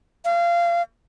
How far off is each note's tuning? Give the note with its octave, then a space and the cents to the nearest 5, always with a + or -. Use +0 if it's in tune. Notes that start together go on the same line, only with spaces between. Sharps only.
F5 -25